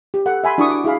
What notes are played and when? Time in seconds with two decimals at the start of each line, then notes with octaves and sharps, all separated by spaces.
0.14 G4
0.26 A4 F#5
0.44 E5 G#5 B5 C6
0.58 D4 E4 F#4 A5 C#6 D#6
0.70 D6
0.85 E4 G#4 F5 B5